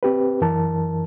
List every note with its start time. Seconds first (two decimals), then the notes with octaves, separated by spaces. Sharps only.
0.03 C4 G4 B4
0.41 F#2 E3 A#4 A5